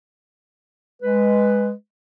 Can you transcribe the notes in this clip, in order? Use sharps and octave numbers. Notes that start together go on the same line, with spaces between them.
G#3 B4